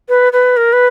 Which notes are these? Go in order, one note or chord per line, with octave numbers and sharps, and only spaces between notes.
B4
B4
A#4
B4